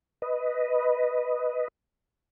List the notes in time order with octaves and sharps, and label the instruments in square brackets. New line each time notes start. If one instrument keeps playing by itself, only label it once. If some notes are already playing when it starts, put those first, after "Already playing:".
[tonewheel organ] B4 D#5